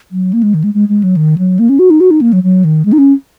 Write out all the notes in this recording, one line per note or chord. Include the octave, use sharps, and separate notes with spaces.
F#3
A#3
G#3
D#3
G#3
G#3
G#3
F#3
D#3
F#3
A#3
C#4
F#4
D#4
F#4
D#4
A#3
F#3
F#3
D#3
G#3
D#4
C#4